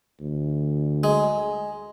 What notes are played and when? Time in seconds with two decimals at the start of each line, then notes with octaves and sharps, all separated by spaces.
0.20 D2
1.04 G#3